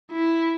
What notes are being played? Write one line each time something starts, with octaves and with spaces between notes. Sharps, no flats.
E4